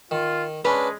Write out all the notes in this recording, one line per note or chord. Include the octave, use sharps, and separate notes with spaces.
D#3 F4
G#3 C#4 D4 B4